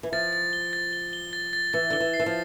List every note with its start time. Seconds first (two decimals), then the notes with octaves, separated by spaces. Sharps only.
0.03 E3
0.12 F3 A6
0.33 A6
0.53 G7
0.73 A6
0.93 G7
1.13 G7
1.33 A6
1.53 A6
1.73 E3 A6
1.90 D3 G7
2.00 E3
2.14 C7
2.20 E3
2.26 F3